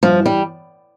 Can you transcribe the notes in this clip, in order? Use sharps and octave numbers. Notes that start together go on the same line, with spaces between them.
G2 F3
E3
G3